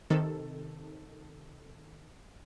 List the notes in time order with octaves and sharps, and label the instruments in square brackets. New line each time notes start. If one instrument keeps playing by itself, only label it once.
[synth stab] C3 D#3 A4